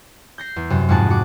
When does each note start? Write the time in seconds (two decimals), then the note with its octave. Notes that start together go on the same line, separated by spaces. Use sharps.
0.38 G6 A#6 C7
0.56 E2
0.70 F#2 C3
0.89 F2 G#2 G#3 F#5 G#5 A5
1.10 F#4 F#5 D6